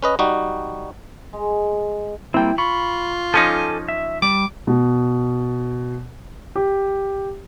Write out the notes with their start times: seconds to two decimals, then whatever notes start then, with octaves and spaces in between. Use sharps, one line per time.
0.02 C#4 B4 D#5
0.19 G3 D#4 F#4
1.33 G#3
2.34 G3 A#3 C4 E4 G5
2.58 F4 B5 C#6
3.34 F3 C#4 D#4 A4 G#5 D6
3.88 E5
4.22 G3 D6
4.67 B2
6.55 G4